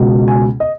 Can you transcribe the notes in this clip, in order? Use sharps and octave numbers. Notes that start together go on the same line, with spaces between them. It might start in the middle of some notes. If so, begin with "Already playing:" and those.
Already playing: C#2 B2
G#5
D#5